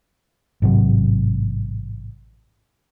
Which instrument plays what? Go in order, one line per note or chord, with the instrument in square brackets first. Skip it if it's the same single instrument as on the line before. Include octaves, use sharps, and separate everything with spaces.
[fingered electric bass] A1 G#2 C3 F#3